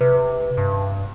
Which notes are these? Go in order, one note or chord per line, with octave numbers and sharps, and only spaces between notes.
C3 B4
G2